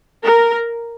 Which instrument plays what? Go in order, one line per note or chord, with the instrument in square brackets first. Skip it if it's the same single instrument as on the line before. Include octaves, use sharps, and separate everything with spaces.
[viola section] A#4